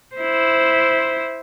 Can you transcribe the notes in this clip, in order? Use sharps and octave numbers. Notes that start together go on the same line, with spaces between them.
E4 C5